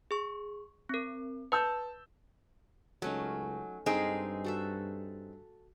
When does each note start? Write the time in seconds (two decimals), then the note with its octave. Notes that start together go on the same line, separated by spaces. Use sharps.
0.11 G#4 C#6
0.89 C4 A#4
1.52 B4 A5 E6 G6
3.02 C#2 F#3 A3 C#4 D#4
3.86 G2 G#3 A3 C4 D#4 G#4 A#4
4.44 F#4 A4 E5